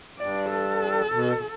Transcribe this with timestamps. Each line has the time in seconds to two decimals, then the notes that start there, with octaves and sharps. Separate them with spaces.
0.18 G2 D5
0.50 A4
1.11 B2
1.37 B2